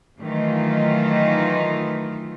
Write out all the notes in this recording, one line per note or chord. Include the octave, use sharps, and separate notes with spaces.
D#3 E3 F#3 A3 D#4 F4